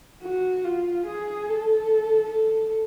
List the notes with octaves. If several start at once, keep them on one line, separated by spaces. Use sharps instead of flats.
F#4
F4
G#4
A4
A4